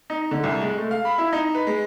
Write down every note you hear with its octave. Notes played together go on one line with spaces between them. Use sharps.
D#4
D3
C2
G#3
A3
F5
B5
E4
D#4
B4
G#3